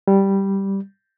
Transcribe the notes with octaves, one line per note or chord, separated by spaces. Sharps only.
G3